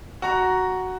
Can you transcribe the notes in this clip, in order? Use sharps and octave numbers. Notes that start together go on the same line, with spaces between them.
F#4 A#5